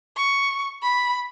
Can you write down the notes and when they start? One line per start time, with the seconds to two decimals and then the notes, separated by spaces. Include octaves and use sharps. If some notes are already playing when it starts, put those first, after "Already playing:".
0.17 C#6
0.83 B5